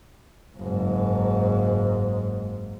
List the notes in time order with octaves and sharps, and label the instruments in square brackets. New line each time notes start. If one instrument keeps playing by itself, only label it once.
[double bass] F#1 G#2